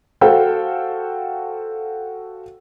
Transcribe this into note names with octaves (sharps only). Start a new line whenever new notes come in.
F#4 A4 C5 F5 G5